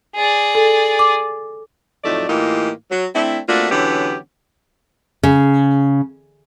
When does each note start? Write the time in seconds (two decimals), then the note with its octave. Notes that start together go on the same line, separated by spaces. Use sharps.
0.16 G#4 D5
0.55 A4
0.99 D6
2.04 F2 A2 F#3 A3 D#4 D5
2.29 A2 E3 A#3 D#4 F4 G4
2.91 F#3
3.15 A3 C4 D4 E4
3.49 A3 A#3 C4 D4 F4 F#4
3.71 D3 E3 F#3 B3 C#4 G4
5.23 C#3